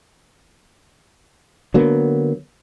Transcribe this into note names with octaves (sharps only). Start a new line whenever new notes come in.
D3 F#3 A#3 B3